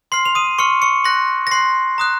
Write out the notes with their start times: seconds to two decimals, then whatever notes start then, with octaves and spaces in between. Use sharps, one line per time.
0.12 C6 F6 C7
0.25 F7
0.35 D#6 D#7
0.59 C6 C#6 F6 C#7
0.82 C#6 C#7
1.04 C6 F#6 A#6
1.47 A#6
1.51 C6 F#6 C7
1.98 A#5 D#6 F#6